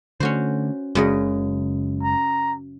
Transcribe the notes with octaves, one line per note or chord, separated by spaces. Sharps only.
D3 A3 C#4 F#4 C5
F#1 F#2 C#3 G#3 D#5
A#5